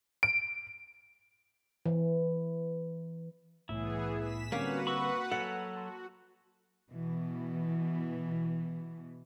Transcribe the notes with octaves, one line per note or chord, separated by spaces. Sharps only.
D7
E3
C2 A2 E3 B3 E4 G#4
B6 E7
D3 G3 A#3 C4 C#4 F#4 B4 F#5
B5 C#6 E6
F#3 A4 F#5 G#5 A6
F#4 A5 C6
B2 E3